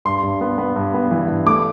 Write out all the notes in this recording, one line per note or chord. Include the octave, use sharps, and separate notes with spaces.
G2 C6
G2
B3
B3
G2
B3
E3
G2
A3 D6